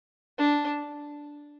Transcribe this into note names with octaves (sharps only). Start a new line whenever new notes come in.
D4